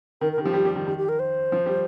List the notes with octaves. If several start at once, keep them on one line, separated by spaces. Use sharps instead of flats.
D#3 A#4
A#4
D#3
F3 G4
G3
G3
D#3
D#3 G4
G4
A#4
C5
F3
G3